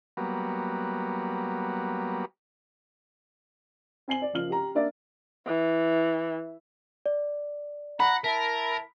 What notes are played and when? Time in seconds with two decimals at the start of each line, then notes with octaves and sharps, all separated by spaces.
0.17 F#3 G3 A#3 B3
4.08 C4 G#5 C7 F#7
4.22 D5
4.33 F#1 F3 F6 F#7
4.50 G4 A#5
4.75 A#3 D4 D5 E5
5.47 E3
7.06 D5
8.00 F#5 A#5 B5
8.24 E4 A#4 E5 A5 B6